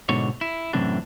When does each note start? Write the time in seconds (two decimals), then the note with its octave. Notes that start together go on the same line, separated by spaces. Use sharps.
0.09 G#2 B2 D3 C#5
0.41 E4
0.73 F#2 A2 C3 E3 D4